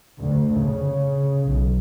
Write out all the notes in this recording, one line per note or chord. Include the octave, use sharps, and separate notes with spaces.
D2
C#3
B1